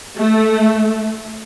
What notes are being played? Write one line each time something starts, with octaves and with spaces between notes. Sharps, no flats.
A3